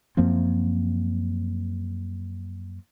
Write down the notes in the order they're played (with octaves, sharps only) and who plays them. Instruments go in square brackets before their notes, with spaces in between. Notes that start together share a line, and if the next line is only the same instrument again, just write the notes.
[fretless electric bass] F#2 F3 A#3 C4